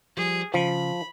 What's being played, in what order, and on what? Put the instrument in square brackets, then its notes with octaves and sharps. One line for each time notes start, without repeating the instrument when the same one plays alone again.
[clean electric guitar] F3 G3 [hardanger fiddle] G#4
[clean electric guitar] C#3 [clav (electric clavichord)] F3 [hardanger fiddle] B5